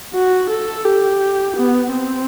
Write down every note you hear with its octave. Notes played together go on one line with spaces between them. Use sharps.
F#4
A4
G4
B3
C4